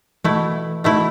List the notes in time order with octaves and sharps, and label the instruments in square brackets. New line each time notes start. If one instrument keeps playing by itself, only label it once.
[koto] B2 A3 E4 [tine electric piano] E3
[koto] B2 A3 E4